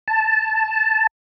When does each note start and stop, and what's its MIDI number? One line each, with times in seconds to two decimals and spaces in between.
0.08 1.07 81